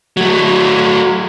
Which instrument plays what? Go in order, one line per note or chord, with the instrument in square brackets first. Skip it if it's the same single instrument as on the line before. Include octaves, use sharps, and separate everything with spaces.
[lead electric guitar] F#3 A3